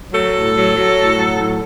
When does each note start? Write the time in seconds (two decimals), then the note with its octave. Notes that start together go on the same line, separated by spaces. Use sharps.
0.13 F#3 A4
0.34 A2
0.55 F#3
0.76 F#3
0.97 A2
1.18 F#3
1.39 A2